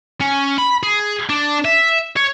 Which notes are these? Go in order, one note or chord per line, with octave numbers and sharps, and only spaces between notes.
C#4
B5
G#4
D4
E5
C#5